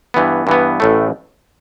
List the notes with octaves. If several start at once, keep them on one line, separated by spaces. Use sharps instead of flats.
G2 E3 B3
G2 E3 B3
A1 A2 A3